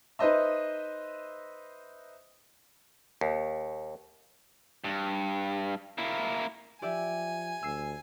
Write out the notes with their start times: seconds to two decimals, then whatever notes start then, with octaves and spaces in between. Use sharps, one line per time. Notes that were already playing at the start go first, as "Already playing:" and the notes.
0.19 D#4 B4 C5 D#5 E5
3.21 D#2
4.84 G2
5.98 A#3 E4
6.82 F3 G4 D5 E5 G#5
7.63 D2 E6 C7